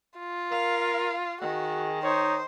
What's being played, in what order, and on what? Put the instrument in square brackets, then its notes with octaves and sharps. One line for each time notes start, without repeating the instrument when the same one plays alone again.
[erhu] F4
[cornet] A#4 [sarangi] F5
[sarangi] D#3 [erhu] F#4 [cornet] G#4
[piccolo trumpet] D#4 [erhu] C5 [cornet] C#5